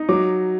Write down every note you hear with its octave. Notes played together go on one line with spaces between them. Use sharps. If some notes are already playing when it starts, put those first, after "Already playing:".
Already playing: D#4
F#3 D6